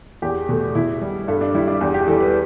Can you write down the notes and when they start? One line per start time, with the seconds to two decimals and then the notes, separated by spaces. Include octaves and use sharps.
0.22 E2 G4
0.49 B2 A3
0.75 B2 E4
1.01 G3
1.28 G2 A4
1.41 D4
1.54 G3 E4
1.68 D4
1.81 E2 G4
1.94 G4
2.07 E3 G3 A4
2.20 B4